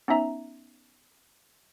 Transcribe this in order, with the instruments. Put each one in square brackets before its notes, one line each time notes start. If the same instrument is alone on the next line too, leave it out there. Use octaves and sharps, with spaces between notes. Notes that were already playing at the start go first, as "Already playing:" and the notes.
[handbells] B3 C#4 D#4 E5 A#5